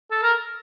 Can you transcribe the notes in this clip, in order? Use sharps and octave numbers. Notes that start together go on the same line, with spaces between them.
A4
A#4